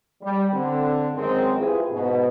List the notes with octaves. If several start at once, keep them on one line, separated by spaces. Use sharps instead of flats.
G3
D3 C4
F#2 D#3 G#3 C4
E4 F4 G4 G#4 B4
G#2 B2